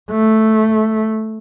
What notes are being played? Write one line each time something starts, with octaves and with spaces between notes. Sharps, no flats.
A3